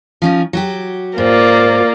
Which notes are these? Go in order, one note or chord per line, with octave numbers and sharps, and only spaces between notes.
F3 C#4 D#4
F#3 F#4 G4
G#2 A#3 F4 D5